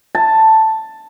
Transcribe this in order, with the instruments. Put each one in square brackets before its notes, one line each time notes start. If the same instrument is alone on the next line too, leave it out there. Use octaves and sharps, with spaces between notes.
[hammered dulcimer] A5